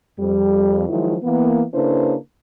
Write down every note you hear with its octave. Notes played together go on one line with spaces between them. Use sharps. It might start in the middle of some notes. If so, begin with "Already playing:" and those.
F2 G3
D#3 F3 F#3 G#3 E4
E3 A#3 B3
C#3 A#3 D4 E4 B4 C5